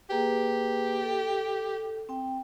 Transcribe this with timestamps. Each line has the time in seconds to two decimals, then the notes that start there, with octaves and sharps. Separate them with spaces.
0.10 A#3 G4 G#4 B4
1.02 A4
2.09 C4 G5